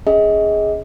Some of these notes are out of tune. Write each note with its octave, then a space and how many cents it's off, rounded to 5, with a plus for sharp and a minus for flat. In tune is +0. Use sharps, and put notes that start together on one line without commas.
C#4 +20 G#4 +0 D#5 +30